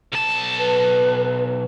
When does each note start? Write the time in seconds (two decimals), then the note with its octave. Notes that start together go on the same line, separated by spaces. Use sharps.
0.12 B1 A5
0.58 B4